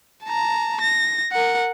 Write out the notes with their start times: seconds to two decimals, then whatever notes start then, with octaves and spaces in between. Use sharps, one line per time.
0.25 A5 A#5
0.80 A#6
1.32 A#4 F#5